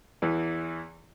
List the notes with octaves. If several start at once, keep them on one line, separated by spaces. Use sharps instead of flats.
E2 E3